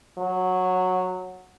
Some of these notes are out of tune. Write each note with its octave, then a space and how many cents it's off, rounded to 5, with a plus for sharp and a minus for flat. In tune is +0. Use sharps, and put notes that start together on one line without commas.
F#3 -10